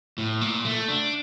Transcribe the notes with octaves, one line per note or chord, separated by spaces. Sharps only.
A2
A#2
A3
D4